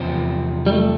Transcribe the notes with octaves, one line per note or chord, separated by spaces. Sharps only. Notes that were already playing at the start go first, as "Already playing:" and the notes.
Already playing: E2 C3 F3 C4
G3
A3